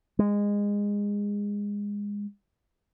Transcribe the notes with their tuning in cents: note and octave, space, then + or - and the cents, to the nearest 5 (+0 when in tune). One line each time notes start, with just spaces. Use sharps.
G#3 -20